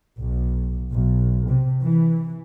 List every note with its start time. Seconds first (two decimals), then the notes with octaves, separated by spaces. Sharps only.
0.18 B1
0.92 B1
1.49 C3
1.82 E3